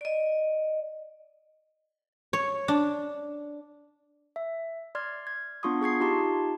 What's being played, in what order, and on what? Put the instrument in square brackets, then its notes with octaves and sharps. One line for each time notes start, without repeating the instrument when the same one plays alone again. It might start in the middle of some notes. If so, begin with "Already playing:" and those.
[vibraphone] D5 D#5
[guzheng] C#5
D4
[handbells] E5
D5 C6 F6 G#6
G#6
B3 D4 F4 C6 C#6 D#6
G#4 C#6 G#6 C7
D#4 F4 G4 A5 C6